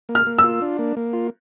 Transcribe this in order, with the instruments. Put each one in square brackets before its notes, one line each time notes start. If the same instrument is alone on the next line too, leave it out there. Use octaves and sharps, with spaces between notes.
[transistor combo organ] A#3
[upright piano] F6
[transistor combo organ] A#3
[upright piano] E6
[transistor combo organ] F4
D4
A#3
A#3
F4